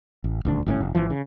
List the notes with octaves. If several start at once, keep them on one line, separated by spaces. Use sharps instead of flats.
A1
D#1 D2 D4
G1 A2 D3 C#4
F1
G#1 F2 E3 F3
C#3